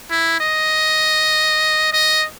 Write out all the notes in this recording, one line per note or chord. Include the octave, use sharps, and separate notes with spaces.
E4
D#5
D#5